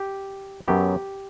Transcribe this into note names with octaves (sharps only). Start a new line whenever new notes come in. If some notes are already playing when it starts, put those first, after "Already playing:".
Already playing: G4
F#2 F#3 B3 G4